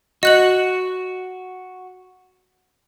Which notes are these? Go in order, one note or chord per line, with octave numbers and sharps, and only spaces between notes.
F#4 D#5 F#6 F#7